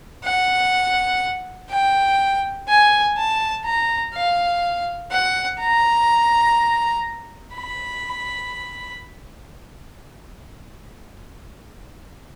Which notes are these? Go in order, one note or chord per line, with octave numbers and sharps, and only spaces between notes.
F#5
G5
G#5
A5
A#5
F5
F#5
A#5
B5